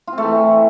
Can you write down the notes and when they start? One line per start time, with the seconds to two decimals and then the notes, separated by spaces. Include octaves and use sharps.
0.07 F4
0.13 C4
0.18 A3
0.23 E3